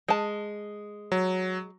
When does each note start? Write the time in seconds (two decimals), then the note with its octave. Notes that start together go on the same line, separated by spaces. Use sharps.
0.08 G#3 A5
1.12 F#3